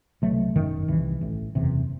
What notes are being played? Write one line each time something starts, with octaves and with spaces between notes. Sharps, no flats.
C2 B2 F#3 A3
G1 F#2 D#3
C2 C3 E3
A1 A2
F#1 E2 C3